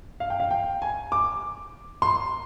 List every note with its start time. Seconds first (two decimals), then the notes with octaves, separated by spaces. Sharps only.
0.20 F5
0.30 G5
0.40 F5
0.51 G5
0.82 G#5
1.12 D6
2.02 C6